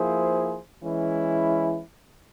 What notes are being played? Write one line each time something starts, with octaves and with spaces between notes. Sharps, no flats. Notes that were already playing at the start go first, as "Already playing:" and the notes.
Already playing: F3 A#3 E4 G#4 C5
E3 G#3 C#4 E4